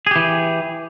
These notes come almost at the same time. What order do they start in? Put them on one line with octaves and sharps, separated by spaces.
G#4 G4 E3